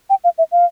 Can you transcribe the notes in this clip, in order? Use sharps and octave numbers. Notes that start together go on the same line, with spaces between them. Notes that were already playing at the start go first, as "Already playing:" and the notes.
G5
F5
E5
F5